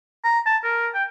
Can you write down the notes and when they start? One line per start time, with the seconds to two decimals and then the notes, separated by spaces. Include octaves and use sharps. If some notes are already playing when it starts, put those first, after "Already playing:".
0.24 A#5
0.46 A5
0.64 A#4
0.95 G5